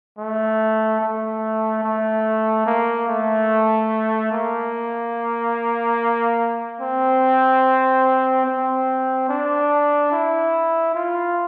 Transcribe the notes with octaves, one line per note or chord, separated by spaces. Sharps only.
A3
A3
A3
A#3
A3
A#3
C4
C4
D4
E4
F4